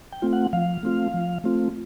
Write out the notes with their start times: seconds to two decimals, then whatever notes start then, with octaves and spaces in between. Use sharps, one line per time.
0.12 G5
0.22 A3 C4 F4
0.33 F#5
0.53 F3 F5
0.83 A3 C4 F4
1.14 F3
1.44 A3 C4 F4